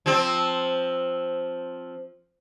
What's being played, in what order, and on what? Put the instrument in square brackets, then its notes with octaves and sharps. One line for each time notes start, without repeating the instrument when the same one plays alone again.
[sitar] F3 C4